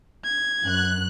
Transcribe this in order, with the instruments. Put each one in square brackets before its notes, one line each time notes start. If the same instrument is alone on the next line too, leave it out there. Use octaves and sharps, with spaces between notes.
[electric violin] G#6
[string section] F#2 F#6